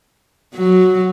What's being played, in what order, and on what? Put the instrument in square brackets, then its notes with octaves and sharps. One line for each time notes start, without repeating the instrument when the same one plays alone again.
[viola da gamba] F#3